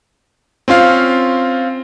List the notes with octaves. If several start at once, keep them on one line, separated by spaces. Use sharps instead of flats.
C4 C#4 F4 F5